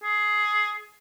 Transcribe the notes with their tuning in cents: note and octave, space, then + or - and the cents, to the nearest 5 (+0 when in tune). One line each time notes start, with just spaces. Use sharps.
G#4 +15